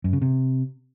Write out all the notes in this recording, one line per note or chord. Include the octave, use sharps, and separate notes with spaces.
F#2
C#3
C3